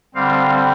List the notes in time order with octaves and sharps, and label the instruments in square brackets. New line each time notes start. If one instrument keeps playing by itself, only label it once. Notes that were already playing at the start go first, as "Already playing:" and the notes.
[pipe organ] D3 G3 C4 F5